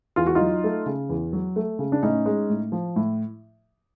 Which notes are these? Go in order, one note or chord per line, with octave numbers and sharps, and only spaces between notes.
E2 F4
F#4
F#3 D#4 F4
A3
C#3
E2
F#3
A3
C#3
D4
A2 C#4 D#4
G#3
A2
F3
A2